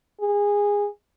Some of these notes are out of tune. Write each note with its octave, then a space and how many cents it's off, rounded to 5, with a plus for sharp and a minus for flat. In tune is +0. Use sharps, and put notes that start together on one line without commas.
G#4 -20